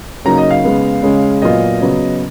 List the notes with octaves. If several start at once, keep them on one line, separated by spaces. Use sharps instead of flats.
C#3 F#3 A#3 D#4 A#5
D#5
F5
C#3 G#3 B3
C#3 G#3 C#4
A#2 F#3 B3 F4 D#5
C#3 F#3 B3